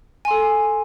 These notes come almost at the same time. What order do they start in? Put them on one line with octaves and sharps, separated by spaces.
G#5 C6 A4